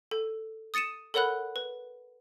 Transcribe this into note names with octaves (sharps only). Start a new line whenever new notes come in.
A4
D#6 A6 C#7 D#7 E7
A4 A#4 C#5 F#5 B5 F#6
B4